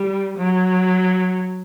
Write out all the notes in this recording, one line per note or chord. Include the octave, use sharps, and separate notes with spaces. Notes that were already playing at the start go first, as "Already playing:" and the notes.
Already playing: G3
F#3